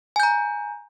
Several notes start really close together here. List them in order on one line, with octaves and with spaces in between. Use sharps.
G#5 G6 A#5